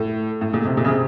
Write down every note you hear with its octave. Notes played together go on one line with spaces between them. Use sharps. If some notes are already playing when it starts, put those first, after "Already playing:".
Already playing: A2
A2
A#2
C3
A#2
C#3
C3